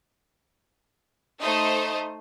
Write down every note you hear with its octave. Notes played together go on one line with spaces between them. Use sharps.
A3 D#4 C5 D#5